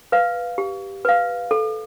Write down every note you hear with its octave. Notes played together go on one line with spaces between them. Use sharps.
B4 F5
G4
B4 F5
A4